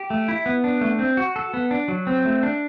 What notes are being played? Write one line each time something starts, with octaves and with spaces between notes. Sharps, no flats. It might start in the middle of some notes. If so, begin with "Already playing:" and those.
Already playing: G4
A3
E4
B3
D4
A3
C4
F#4
A4
B3
D4
F#3
C4
A3
D4